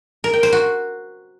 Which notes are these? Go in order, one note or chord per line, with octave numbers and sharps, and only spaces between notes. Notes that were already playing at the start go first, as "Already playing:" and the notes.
A#4
G5
C5
F#4